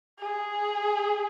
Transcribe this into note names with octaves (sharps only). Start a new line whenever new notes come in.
G#4